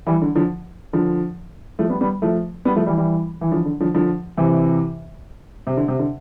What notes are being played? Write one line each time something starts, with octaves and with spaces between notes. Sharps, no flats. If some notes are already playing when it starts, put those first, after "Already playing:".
E3 G3
D3
D3 F3
D3 F3
F3 A3
G3 B3
G3 B3
F3 A3
G3 B3
F3 A3
E3 G3
E3 G3
E3
D3 F3
D3
D3 F3
D3 F3
C3 E3
C3
D3
C3
D3